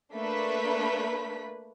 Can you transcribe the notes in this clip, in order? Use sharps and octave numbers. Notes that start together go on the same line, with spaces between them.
A3 A#3 D4 B4 B5 B6